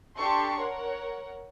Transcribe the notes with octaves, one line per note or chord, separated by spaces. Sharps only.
D4 G4 A4 A5 C6 C#6
A#4 C#5 F#5